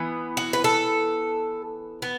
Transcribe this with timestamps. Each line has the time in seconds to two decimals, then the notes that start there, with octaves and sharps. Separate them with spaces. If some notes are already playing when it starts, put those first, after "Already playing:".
Already playing: E3 B3
0.37 F#4
0.53 B4
0.64 A4
2.02 B3